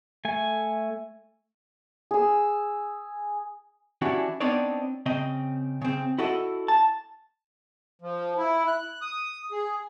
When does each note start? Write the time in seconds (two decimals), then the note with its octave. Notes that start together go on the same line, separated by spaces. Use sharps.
0.25 A3 G#5
2.11 G#4 E6
4.02 E3 C#4 D4 E4 F#4 G4
4.40 B3 C4 D4 D#4 C#5 D5
5.06 C#3 C4 D#5
5.82 C#3 C4
6.18 E4 F#4 A4 D#5
6.68 A5
8.02 F3
8.38 E4
8.68 F#6
9.02 D#6
9.52 G#4